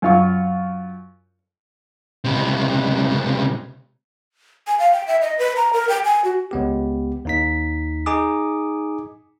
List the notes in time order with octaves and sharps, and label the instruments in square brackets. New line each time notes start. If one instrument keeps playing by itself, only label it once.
[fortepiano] F#2 F4 C#6
[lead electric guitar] C#2 C3
[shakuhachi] G#5
F5
G5
E5
D#5
B4
A#5
A#4
G5
G#5
F#4
[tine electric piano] C#2 B3 G4
D#2 D#4 B6
D#4 G#4 G#5 D6 D#6